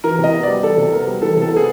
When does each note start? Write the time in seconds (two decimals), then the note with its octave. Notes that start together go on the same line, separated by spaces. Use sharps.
0.04 E3 A#4
0.18 C3
0.24 D#5
0.33 B3
0.43 G3 D5
0.63 E3 A4
0.77 C3
0.92 B3 A#4
1.07 G3
1.22 E3 A4
1.37 C3
1.42 A4
1.51 B3
1.57 G#4